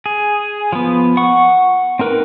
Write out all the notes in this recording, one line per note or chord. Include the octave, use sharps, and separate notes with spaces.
G#4
F3 B3
F#5 C#6
C4 D#4 A#4 B4